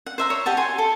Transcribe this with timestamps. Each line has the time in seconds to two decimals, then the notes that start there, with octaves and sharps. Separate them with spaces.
0.06 F#5
0.18 C5 E5 A#5
0.30 C#5
0.46 G4 D#5 F#5 A5
0.57 G#5 C6
0.78 A4